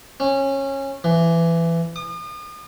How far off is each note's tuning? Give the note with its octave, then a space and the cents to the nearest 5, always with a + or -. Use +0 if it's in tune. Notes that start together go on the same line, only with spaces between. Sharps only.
C#4 -20
E3 +20
D#6 -40